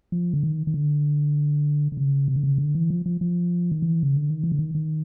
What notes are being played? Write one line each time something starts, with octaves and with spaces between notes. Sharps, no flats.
F3
D3
D#3
D#3
D3
D3
C#3
C3
D3
C#3
D3
E3
F3
F3
F3
D#3
E3
C#3
D3
D#3
E3
D3
D#3
D#3